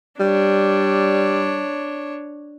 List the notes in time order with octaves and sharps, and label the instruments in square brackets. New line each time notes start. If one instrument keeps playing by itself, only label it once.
[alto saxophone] G3 [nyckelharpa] D4 C#5